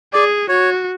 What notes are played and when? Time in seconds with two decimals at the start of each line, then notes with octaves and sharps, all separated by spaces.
0.13 G#4 D5
0.49 F#4 C#5